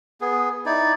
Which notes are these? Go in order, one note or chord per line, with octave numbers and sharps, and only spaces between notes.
B3 G#4
D#4 E4 D5